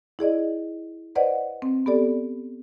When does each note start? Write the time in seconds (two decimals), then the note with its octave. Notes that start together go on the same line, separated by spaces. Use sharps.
0.19 E4 G#4 D5 D#5
1.15 B4 C5 D5 D#5 F#5
1.62 C4
1.86 B3 G4 A4 D5